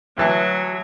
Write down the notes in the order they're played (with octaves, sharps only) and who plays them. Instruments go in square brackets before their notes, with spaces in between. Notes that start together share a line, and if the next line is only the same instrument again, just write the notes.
[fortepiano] D2 E3 A5 [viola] F#3